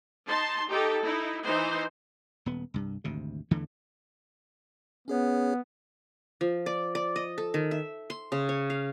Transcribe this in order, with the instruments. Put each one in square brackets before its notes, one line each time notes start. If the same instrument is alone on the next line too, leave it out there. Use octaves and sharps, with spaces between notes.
[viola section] D#4 A5 C6
D#4 G4 A4
D#4 E4
E3 D#4 C5
[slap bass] D#1 B3
C2 G2
G#1 D2 C3
E2 D3 E3 A3
[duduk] B3 [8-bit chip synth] C#4 G#4 C#5
[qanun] F3
D5
D5
D#5
A4
D#3
E5
C6
C#3
C#5
F5